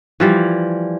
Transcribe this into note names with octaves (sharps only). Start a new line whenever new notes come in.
E3 F3 G3